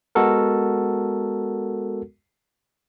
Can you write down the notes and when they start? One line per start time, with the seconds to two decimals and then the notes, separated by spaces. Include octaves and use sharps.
0.15 G#3 B3 F#4 A4 A#4